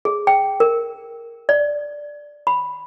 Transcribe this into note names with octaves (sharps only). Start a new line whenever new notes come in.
G#4
G5
A#4
D5
B5